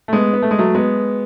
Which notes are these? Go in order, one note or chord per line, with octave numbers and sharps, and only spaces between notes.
A3
G#3 B3
B3
A3
G#3
F#3 A3
G#3 B3